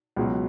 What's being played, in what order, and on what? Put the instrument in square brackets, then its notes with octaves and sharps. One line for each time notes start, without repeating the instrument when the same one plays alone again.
[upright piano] C#2 B2 F#3